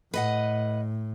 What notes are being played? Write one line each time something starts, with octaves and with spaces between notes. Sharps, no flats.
A2 B4 D#5 F#5